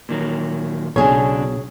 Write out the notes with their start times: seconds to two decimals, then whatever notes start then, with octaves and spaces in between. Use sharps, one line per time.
0.09 A#2 D#3 F#3
0.96 B1 C#3 D4 G#4 C#5